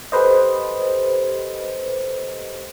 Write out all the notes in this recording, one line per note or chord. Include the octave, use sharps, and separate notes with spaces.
G4 A4 B4 C5 D#5